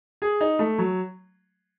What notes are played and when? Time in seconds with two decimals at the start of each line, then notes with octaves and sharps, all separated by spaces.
0.22 G#4
0.41 D#4
0.59 A3
0.78 F#3